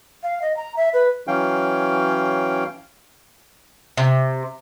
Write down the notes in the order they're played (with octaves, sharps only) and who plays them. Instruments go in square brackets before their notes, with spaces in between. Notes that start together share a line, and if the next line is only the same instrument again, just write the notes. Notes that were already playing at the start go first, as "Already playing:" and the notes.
[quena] F5
D#5
A#5
E5
B4
[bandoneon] E3 F#3 C#4 F5 G5
[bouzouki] C3